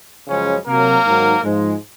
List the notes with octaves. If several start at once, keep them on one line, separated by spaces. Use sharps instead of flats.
F#2 C#3 F3 G#3 C#4
C3 F#3 A#3 A#4
G#2 D#3 F#3
G#2 F3 G#3